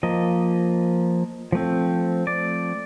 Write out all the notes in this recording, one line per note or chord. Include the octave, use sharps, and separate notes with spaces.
F3 A#3 D#5
F3 A3 C4
D5